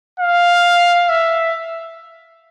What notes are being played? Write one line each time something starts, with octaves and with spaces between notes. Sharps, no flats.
F5
E5